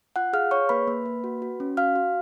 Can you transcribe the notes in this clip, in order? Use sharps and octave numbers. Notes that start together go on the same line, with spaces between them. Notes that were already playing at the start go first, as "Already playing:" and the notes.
F4 F#5 F#6
G#4 F5 F6
G#4 C#5 C#6
A#3 B4 B5
A#3
A#3
F#4
F#4
C#4
F#4 F5 F6
F#4